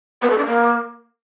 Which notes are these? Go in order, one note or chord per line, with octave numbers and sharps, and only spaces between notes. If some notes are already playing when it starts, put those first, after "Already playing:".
B3
A4
D4
A#3